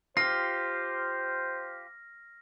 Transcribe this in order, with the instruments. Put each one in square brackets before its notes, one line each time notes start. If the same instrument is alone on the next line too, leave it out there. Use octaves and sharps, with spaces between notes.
[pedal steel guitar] F4 G4 [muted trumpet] C5 [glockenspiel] F6 A#6 [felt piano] C7